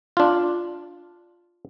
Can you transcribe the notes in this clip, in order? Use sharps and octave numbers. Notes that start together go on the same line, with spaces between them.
D4 F4